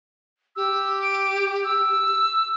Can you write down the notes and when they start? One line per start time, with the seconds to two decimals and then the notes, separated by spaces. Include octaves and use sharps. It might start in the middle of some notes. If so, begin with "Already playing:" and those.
0.56 G4 E6
1.02 D7
1.64 E6